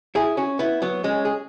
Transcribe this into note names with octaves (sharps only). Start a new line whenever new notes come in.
E4 G#4
C#4 F#4
B3 E4
F#3 B3
G#3 C#4
G#4